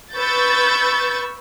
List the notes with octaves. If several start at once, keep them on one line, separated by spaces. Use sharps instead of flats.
B4 C#6 E6 G6 A6